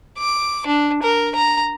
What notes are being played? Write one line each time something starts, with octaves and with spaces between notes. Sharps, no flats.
D6
D4
A#4
A#5